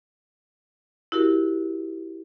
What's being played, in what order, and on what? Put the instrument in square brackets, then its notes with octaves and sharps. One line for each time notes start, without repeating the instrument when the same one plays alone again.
[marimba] E4 F#4 G4 A#4